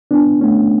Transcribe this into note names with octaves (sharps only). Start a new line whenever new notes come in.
B3 D4
A3 C#4